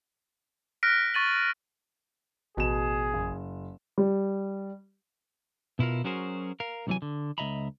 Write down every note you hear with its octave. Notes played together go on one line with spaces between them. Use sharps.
F6 F#6 A#6 B6 D7
C#6 A6 D#7 F#7
A1 B2 G#4 E7
F#1
G3
B2 E4 F4 A#4
F#3 C#4 F#4 G#4 A#4 C5
A#4 F5
C2 C3 E3 F#3 G#5
D3
C#2 F3 D#5 E5 A#5 B5